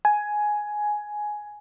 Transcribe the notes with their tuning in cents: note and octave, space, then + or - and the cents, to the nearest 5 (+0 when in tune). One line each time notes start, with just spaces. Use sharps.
G#5 +10